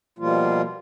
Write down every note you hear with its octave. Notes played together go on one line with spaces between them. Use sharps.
B2 F3 G3 A#3 F4